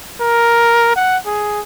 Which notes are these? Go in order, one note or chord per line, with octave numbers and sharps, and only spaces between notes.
A#4
F#5
G#4